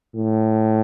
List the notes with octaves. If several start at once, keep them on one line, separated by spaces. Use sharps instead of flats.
A2